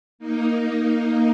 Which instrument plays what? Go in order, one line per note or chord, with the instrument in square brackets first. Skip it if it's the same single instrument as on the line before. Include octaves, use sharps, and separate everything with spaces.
[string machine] A#3 D#4